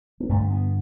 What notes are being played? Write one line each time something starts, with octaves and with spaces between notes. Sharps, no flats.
B3
G2 D3 A3
B3